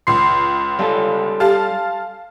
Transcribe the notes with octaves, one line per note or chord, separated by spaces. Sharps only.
C#2 C6 C7
G3 C#4 A4 F5
G4 F5 A5